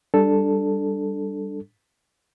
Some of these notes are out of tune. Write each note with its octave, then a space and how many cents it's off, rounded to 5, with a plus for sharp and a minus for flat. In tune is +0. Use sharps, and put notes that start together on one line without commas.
G3 +0 D4 +0 A4 +0